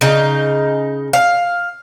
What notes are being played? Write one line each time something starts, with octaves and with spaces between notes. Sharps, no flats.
C#3 D#4
F5